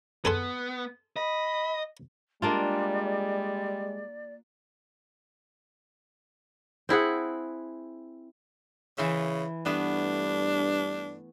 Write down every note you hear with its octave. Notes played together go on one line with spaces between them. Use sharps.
B3 G#4 A4 C6
D#5 B5
G3 G#3 A#3 D4 F4 D5
C4 E4 G#4 F#5
C#3 E3 C5 E5
G2 A3 B3 D4